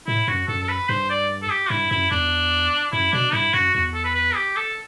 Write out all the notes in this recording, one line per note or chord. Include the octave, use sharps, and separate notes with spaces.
A2 E4
F#2 F#4
F#2 A4
A4
B4
G2 C5
D5
A4
G4
G2 E4
F#2 E4
E2 D4
F#2 E4
B2 D4
G2 E4
F#2 F#4
E2 F#4
A4
B4
B4
G4
A4